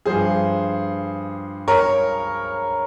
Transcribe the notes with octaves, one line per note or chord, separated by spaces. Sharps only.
G2 F3 G#4 C5
A#4 C#5